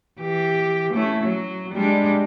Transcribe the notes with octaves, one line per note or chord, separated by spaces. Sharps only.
E3 G4
A3 C#4 E4
F#3
G3 G#3 D4